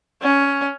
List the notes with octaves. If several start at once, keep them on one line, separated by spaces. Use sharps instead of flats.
C#4